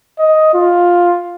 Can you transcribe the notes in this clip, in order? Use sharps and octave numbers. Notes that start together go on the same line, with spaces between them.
D#5
F4